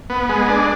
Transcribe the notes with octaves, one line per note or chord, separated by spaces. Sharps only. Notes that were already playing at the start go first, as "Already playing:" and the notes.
B3
G#3
D4